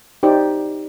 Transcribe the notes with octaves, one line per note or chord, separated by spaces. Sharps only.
D#4 G4 C5 D5